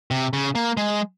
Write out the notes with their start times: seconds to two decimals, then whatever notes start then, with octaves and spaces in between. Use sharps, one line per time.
0.11 C3
0.33 C#3
0.55 A#3
0.77 G#3